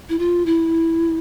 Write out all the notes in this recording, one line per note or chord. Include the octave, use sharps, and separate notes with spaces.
E4
F4
E4